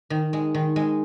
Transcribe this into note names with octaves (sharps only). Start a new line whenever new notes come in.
D#3
G#3
D#3
G#3